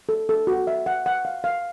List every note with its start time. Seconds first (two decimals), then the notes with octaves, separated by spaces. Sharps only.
0.09 A4
0.29 A4
0.47 F#4
0.67 E5
0.86 F#5
1.06 F#5
1.25 F5
1.44 F5